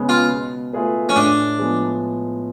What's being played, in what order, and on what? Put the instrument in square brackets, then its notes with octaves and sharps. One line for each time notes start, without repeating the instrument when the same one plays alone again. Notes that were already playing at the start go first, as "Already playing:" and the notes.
Already playing: [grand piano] C#3 G#3 B3
[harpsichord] F4
[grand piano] B2
A3 F4 G#4 B4
[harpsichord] C#4
[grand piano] A2 [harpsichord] D4
[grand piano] F3 G#3 B3